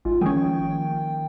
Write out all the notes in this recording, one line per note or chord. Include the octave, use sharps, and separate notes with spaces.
G#1 F4
D#3 F3 G#3 A#3 C#4 G5